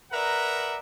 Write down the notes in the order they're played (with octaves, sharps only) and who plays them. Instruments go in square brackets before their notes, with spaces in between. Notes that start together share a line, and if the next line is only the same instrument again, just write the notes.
[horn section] A#4 B4 D5 E5 F#5 A#5